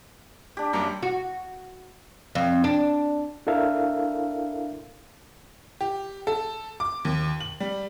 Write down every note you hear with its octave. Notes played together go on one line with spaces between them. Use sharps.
D4 G4
F#2 G3 A#3 A#5 D6
F#4
F2
D4
D4 E4 A4 A#4 E5 F5
G4
A4
D6
D#2
F#7
G3